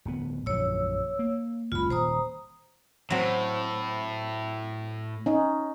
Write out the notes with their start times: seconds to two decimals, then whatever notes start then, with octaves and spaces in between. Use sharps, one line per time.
0.05 D1 B3
0.46 A#1 F#2 F3 C#5 E6
1.19 A#3
1.72 F#1 C#2 F4 B5
1.90 D#1 C5 A#5 D#6
3.11 A2 F#3 C4
5.26 C#4 D#4